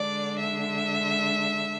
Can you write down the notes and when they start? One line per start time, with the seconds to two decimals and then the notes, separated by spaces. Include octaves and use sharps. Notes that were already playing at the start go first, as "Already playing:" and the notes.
Already playing: D3 G#3 D4 D5
0.39 E5